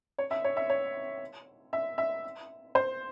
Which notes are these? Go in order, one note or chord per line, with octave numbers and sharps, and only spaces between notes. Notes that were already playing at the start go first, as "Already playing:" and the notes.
C#5
E5
C#5
E5
C#5
E5
E5
C5